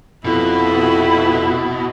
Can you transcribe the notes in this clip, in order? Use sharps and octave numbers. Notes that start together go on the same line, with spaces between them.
F2 B2 E4